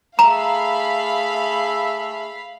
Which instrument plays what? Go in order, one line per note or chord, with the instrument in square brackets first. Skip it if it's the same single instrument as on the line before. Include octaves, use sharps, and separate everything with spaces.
[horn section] A3 G#4 E5 [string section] F5 B5 [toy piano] A#5